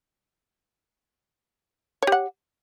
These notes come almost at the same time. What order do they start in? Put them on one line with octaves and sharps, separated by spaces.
C#5 G4 F#5